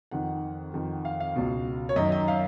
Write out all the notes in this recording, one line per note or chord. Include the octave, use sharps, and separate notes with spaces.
F2 D#3 F#5
F2 D#3
F5
F5
C#2 B2
C#5
F#2 D#3 D#5
D#5
F5